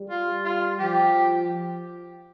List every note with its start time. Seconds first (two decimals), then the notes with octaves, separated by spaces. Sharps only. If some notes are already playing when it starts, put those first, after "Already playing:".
Already playing: G3
0.10 F4
0.45 F4
0.79 F3 G4